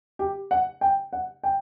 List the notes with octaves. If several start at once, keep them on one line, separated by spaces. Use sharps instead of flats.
G4
F#5
G5
F#5
G5